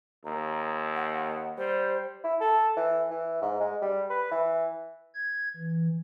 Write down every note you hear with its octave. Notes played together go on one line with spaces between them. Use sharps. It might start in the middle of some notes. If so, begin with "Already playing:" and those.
D#2 A#5
F#5
G3 C5
E4
A4
E3
E3
G#2
G#3
G3
B4
E3
G#6
E3